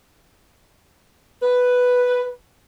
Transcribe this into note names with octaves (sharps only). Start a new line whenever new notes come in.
B4